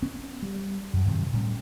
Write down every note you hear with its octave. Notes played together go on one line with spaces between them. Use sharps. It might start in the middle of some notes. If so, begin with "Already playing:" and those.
B3 C#4
G3
F#2
G2 C3 D#3 F#3
A2 G3 C#4